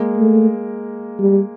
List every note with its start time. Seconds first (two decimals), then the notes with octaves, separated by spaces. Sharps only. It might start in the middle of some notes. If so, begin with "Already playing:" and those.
Already playing: G#3 A#3
0.17 A3
1.19 G3